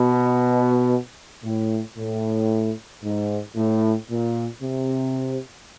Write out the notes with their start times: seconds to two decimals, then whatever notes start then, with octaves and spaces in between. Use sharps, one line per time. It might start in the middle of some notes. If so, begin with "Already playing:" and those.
Already playing: B2
1.43 A2
1.96 A2
3.03 G#2
3.56 A2
4.10 A#2
4.62 C3